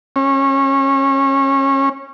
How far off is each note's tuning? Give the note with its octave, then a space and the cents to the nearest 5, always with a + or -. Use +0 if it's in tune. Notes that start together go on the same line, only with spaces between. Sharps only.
C#4 -25